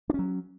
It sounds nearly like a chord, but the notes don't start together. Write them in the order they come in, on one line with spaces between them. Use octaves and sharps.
D4 C#4 F#3